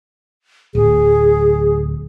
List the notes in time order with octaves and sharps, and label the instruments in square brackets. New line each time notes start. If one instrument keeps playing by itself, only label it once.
[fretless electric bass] D1 [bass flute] G#4